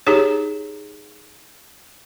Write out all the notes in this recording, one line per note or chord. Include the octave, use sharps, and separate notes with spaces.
D#4 G4 G#4 C#5